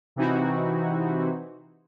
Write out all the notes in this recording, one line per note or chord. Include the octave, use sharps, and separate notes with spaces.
C3 E3 C4 D#4 E4 F#4